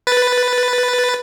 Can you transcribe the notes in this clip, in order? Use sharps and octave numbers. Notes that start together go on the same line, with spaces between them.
B4 A6